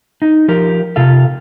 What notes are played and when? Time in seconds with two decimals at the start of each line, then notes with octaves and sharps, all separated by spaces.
0.22 D#4
0.48 F3 G4 A#4
0.96 C3 F4 A4 F5